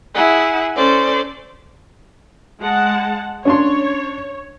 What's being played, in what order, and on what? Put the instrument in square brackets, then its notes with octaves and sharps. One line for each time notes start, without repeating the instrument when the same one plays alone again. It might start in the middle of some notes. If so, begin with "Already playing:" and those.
[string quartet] E4 G#4 F#5
C#4 A4 C5 D5
[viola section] G#3 F#5 A5
[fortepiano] C#4 D4 C6 [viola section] C#5